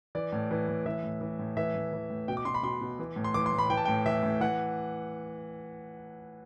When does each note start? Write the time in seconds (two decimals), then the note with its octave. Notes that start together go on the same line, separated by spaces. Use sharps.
0.15 E3 D5
0.32 A2
0.51 E3
0.68 A2
0.86 E3 E5
1.03 A2
1.21 E3
1.39 A2
1.57 E3 E5
1.75 A2
1.93 E3
2.10 A2
2.28 B2 G5
2.37 D6
2.45 B2 C6
2.54 B5
2.63 B2 C6
2.81 B2
2.99 E3
3.16 A2
3.24 C6
3.34 E3 D6
3.46 C6
3.52 A2
3.58 B5
3.70 E3 G5
3.77 A5
3.85 A2 G5
4.06 E3 E5
4.23 A2
4.41 E3 F#5